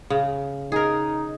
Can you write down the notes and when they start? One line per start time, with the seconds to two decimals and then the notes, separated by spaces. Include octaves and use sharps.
0.10 C#3
0.72 D#4 G#4 A#4